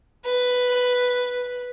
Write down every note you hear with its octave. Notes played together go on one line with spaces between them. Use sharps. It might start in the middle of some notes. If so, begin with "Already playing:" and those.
B4